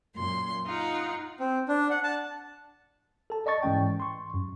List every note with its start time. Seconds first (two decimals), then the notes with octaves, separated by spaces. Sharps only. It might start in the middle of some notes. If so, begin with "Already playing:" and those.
0.15 F#2 A#2 C6
0.66 D#4 F4 F#5
1.40 C4
1.69 D4
1.90 F#5
2.04 A5
3.30 A4 A5
3.46 D5 D#5 A5 C#6 A6
3.63 G#2 E3 G#3 C#4 G5
4.00 C6 C#6
4.34 F#2